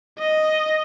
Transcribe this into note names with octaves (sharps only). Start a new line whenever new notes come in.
D#5